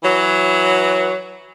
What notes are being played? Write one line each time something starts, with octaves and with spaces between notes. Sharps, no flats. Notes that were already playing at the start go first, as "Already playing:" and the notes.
E3 F#3